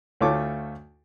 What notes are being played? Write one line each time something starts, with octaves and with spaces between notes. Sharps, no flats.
D2 A3 F4 C#5 D6